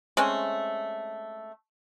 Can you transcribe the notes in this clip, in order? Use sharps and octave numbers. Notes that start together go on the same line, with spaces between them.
G#3 A3 C4 C#4